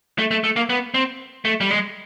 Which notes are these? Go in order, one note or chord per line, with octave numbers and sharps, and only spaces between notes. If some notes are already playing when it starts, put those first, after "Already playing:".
A3
A3
A3
A#3
B3
C4
A3
G3
G#3